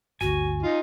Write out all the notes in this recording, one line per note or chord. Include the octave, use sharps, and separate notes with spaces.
G1 D2 F#4 G#5
D#4 F4